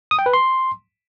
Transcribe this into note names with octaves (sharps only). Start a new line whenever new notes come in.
D#6
G5
B4
C6